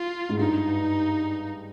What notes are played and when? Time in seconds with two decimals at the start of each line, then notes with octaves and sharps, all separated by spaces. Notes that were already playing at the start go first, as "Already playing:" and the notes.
Already playing: F4
0.29 G#2
0.39 G2 D#4